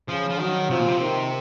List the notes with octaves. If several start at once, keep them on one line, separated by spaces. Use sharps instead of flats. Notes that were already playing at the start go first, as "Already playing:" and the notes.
C#3 F3
F3
D#3 F#3
C3 F3
A#2
C3
D#3